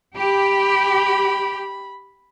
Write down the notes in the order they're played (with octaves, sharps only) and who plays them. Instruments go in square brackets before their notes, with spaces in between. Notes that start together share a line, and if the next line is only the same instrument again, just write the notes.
[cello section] G4 [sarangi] B5